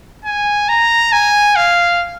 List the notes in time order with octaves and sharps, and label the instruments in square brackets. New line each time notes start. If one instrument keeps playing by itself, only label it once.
[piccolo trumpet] G#5
A#5
G#5
F5